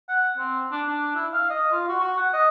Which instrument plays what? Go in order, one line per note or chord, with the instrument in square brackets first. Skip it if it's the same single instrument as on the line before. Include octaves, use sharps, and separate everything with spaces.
[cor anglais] F#5
C4
D4
D4
E4
F5
D#5
F4
F#4
F#4
F#5
D#5